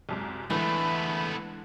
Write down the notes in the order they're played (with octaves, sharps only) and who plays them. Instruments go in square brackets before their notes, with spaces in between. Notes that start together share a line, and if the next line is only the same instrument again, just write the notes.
[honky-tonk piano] C2 F#2 G#3
[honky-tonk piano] D3 G#3 [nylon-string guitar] E3 [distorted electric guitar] A3 B3 [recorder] B5